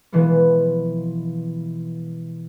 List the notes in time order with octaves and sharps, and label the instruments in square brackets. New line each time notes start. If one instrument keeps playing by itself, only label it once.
[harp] B2 E3 F3 G#3 B3